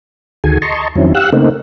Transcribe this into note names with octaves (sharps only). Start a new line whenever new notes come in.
D2 D#3 F#4 G#4 A4 G#5
D#5 A5 A#5 C6 C#6
F2 D#3 F#3 C4 C#4 E4
G4 F5 F#5 E6 F#6
C#3 A3 A#3 C4 D#4